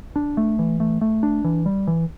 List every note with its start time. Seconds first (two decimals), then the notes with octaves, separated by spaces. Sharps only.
0.16 D4
0.37 A3
0.59 E3
0.80 A3
1.01 A3
1.23 D4
1.44 E3
1.66 G3
1.87 E3